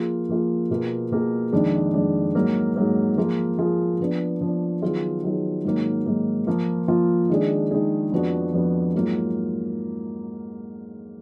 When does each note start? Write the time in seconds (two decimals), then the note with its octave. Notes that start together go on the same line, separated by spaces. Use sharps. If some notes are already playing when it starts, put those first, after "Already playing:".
Already playing: F3 A#3 F4 G#4
0.29 F3 A#3 F4 G#4
0.70 B2 A#3 F4 G#4
1.11 B2 A#3 F4 G#4
1.53 F2 D#3 G#3 D4
1.94 F2 D#3 G#3 D4
2.35 G#2 F#3 A#3
2.76 G#2 F#3 A#3
3.17 F3 A#3 F4 G#4
3.58 F3 A#3 F4 G#4
4.00 F3 B3 D4
4.41 F3 B3 D4
4.82 D#3 F#3 B3 F4 G#4
5.24 D#3 F#3 B3 F4 G#4
5.64 G#2 D#3 F#3 A#3
6.06 G#2 D#3 F#3 A#3
6.47 F3 A#3 F4
6.88 F3 A#3 F4
7.29 D#3 G#3 D4 G#4
7.71 D#3 G#3 D4 G#4
8.12 F2 F3 B3 D4 F#4
8.53 F2 F3 B3 D4 F#4
8.94 G#2 F#3 A#3 F4